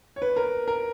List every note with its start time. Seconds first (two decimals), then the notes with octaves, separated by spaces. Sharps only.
0.16 C#5
0.22 B4
0.36 A#4
0.68 A#4